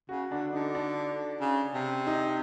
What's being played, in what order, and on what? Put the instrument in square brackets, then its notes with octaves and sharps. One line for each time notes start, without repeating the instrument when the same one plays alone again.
[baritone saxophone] C#3 [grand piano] F#4
[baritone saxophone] D3 [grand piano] D4
[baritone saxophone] D3 [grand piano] D#4
[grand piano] D4
[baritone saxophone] C#3
C3
[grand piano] D#4